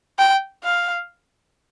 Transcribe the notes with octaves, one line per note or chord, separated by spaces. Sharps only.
G5
F5